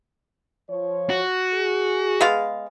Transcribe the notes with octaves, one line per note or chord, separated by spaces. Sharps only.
F3 C#5
F#4
G#4
G#3 B3 F5